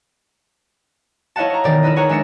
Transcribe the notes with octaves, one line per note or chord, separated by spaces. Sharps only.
E4 C#5 D#5 F5 F#5 A5
C#5 A#5
E1 D#3 D5
E4 A#4 B4 D#5
E4 G#4 C#5 F#5 A#5
G#3 D4 E5 A#6 C#7